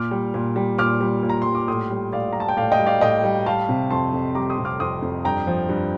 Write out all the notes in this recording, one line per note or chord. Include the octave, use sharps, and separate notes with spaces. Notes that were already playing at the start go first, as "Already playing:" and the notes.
Already playing: A#2 D6 F6
G3
A#2
G3
A#2 D6 F6
G3
A#2
A#5
G3 C6
D6
A2 C6 D#6
G3
A2 D5 F5
G3 A#5
A5
G5
A2 D5 F5
D#5 G5
G3
D5 F5
A2 D#5 G5
G3
G3 F5 A5
C3
F2 A5 C6
F2
G3 A#5 D6
C6 D#6
C3
D6 F6
F2 C6 D#6
F2
G2 G5 A#5
F3
G2